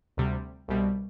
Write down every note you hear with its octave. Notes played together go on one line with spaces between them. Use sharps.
D2 C3 G3
C2 B2 G3